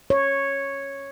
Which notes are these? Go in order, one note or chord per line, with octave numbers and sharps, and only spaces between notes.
C#5